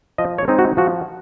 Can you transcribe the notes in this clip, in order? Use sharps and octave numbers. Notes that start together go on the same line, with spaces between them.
F3 D#5
C#5
G#3 C4 D#4
F#4
F3 F#4